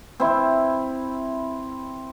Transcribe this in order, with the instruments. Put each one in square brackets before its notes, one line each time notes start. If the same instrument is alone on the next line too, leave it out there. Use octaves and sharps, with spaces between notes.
[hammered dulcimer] C4 E4